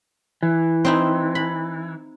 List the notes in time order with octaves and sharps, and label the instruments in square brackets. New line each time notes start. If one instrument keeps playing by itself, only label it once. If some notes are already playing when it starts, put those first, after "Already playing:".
[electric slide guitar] E3
[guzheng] C4 D#4 E4
B5